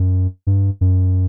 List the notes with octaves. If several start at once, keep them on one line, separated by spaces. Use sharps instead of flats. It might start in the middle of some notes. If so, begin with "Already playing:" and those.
Already playing: F#2
G2
F#2